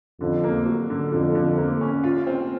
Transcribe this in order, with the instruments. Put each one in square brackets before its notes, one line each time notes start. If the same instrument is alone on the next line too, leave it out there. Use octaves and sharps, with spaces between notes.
[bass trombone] F2 [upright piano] D3
[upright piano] A#3
F#3
D3
[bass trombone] F2 [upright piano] D3
[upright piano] D3
A#3
C#4
F4
C4